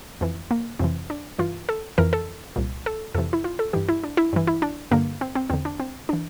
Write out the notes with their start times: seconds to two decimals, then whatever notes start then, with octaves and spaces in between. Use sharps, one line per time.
0.21 F2 E3
0.51 A#3
0.79 F2 C3 E3 C4
1.10 D4
1.39 G2 E3 F4
1.69 A4
1.98 F2 E3 A#4
2.13 A4
2.56 C2 A#2
2.86 A4
3.15 F2 C3 E3 A4
3.33 E4
3.44 F4
3.59 A4
3.73 G2 E3 G4
3.89 E4
4.04 D4
4.17 E4
4.33 G2 E3
4.47 E4
4.62 D4
4.91 G2 D3 A#3
5.21 C4
5.35 C4
5.50 E2 D3 C4
5.65 D4
5.80 C4
6.09 E3 D4